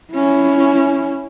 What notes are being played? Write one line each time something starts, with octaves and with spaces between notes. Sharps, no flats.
C#4 E4